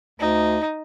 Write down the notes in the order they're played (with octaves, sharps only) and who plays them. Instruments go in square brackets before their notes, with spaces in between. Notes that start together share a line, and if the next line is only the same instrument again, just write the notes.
[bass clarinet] D2 [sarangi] D#4